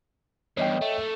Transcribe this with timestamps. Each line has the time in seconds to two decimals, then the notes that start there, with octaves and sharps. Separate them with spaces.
0.57 E2 G2 C#5 D#5 G5
0.82 A3